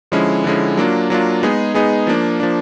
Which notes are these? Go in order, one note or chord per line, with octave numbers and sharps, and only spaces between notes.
D3 F3 G#3 C#4 E4
D3 F3 G#3 C#4 E4
F#3 A#3 D4 F4
F#3 A#3 D4 F4
G#3 B3 D#4 G#4
G#3 B3 D#4 G#4
F3 A#3 D4
F3 A#3 D4